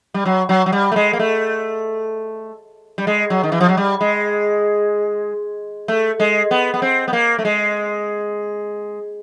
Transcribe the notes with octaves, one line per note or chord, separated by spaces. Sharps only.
G3
F#3
F#3
F#3
G3
A3
G#3
A#3
A3
G3
G#3
F#3
D#3
E3
F3
F#3
G3
G#3
A3
G#3
B3
B3
C4
B3
A#3
A3
G#3